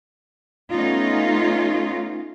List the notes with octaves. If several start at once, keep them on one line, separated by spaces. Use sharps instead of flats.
A3 B3 C#4 D#4 F4